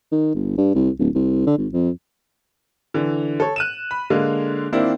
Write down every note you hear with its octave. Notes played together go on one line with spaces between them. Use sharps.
D#3
G1
G2
C2
D1
C2
D3
G#1
F2
D3 E3
A4 C#5
F#6 D#7 E7
B5
D3 G#3 A#3
D#3 A#3 C4 D4 E4